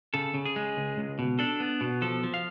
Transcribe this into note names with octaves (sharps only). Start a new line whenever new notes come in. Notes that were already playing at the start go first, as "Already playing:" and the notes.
C#3 A4
C#3
G#4
G#3
C#2
C#2
B2
D4 A4
B3
B2
F3 A4
F3
F5